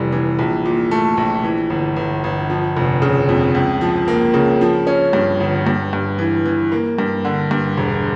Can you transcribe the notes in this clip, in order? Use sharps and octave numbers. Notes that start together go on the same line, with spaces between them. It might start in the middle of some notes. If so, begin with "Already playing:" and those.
Already playing: F1 E3 G3
E3
A#1
A#2
A3
A#1
E3
G1
G1
G1
F3
F1
C#3
F2
C#2
F3
A#3
C#3
F3
C#4
G2
G1
G2
G2
E3
E3
A#3
G2
D3
G2
E1